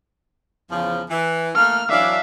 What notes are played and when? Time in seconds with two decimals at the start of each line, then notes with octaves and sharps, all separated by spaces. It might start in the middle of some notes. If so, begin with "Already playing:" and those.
0.70 E2 C#3 F3
1.10 E3
1.55 A3 A#3 F6
1.89 E3 F#3 D4 E5 F5